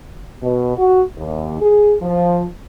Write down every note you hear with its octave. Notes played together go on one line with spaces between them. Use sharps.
B2
F#4
D#2
G#4
F3